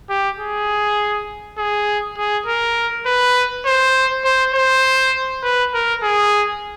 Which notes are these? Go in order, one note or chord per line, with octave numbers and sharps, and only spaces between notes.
G4
G#4
G#4
G#4
A#4
B4
C5
C5
C5
B4
A#4
G#4